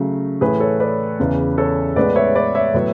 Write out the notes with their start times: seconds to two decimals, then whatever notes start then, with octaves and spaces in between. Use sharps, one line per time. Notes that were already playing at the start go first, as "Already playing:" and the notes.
Already playing: C#3 F#3 A3
0.41 A2 E3 A3 G#4 B4
0.60 A4 C#5
0.80 B4 D5
1.19 E2 C#3 E3
1.58 A4 C#5
1.96 A2 G#3 B3 B4 D5
2.16 C#5 E5
2.35 B4 D5
2.55 C#5 E5
2.74 A2 F#3 B3